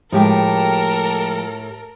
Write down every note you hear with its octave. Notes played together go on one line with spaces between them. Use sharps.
A2 F3 G#3 A3 G4 A4 A#4 G5